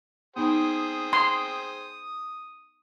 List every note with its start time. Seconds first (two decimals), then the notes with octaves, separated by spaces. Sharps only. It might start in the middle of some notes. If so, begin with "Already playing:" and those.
0.36 B3 D#4 G#4 C5 G5 D#6
1.13 C6